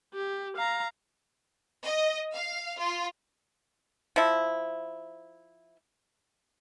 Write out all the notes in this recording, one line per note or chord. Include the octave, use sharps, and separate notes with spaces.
G4
F5 A#5
D#5
F5
F4
F3 E4